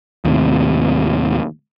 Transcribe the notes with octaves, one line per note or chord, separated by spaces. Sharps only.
D#2 A2 C3